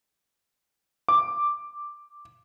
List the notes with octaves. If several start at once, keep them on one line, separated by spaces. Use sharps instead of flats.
D6